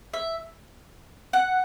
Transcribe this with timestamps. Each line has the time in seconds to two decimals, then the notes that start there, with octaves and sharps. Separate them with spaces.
0.13 E5
1.33 F#5